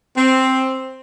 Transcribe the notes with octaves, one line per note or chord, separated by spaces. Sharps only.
C4